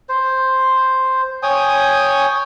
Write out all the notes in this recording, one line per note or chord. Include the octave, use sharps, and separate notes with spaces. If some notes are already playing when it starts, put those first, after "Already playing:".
C5
C#5 G5 G#5 D#6